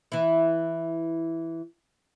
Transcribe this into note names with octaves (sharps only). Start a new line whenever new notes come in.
E3 E4